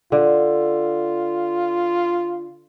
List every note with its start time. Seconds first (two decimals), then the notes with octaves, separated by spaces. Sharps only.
0.12 D3 F4